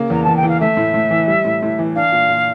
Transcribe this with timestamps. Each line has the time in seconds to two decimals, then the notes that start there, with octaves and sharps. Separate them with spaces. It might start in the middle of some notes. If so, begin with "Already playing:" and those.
Already playing: C#3 A#3
0.10 E2 A#5
0.24 E2 A5
0.36 G5
0.43 E3
0.49 F5
0.61 A3 E5
0.77 A2
0.94 A2
1.11 E3
1.28 G3
1.45 A2
1.62 A2
1.79 E3
1.96 D4 F5
2.12 A#2
2.29 A#2